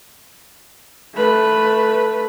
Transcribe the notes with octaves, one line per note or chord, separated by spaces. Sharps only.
A3 B4